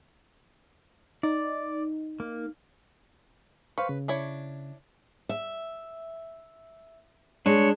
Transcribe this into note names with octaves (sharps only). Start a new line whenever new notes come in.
D#4 D5
A#3
B4 C5 F5 C#6
C#3
D4 E4 C#5
E5
G#3 D4 C#5